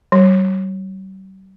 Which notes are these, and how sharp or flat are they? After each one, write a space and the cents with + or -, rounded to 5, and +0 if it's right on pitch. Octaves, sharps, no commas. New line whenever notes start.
G3 -45